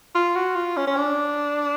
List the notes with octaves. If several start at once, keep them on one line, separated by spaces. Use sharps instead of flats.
F4
F#4
F4
C#4
C#4
D4